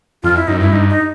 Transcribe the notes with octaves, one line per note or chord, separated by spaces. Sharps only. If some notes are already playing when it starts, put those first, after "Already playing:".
F2 F4
E4
F#2 D#4
G2 E4
G2 D#4
D#4